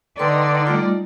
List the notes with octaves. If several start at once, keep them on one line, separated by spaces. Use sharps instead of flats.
D3 D#4 B4 D5 G5 C6
G3 A3 F4